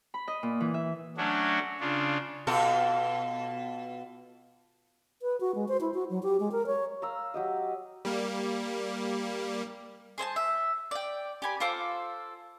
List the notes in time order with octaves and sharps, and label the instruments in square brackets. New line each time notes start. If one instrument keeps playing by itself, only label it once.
[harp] B5
D#5
A#2
E3
E5
[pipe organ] F#3 A3 C#4 D4 F#4
C#3 D4 F4
[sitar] B2 F4 A4
[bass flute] B4
F#4
G#3
C5
E4
F#4
F#3
G4
G#3
A#4
C#5
[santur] F5 A#5 E6
F#3 G4 D#5
[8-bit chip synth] G3 A#3
[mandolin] G#4 C5 G#5 A5
E5
D5 G5
G4 G#5 B5
F4 A4 C5 D6